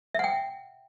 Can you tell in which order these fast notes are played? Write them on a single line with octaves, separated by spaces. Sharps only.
E5 F#5 G5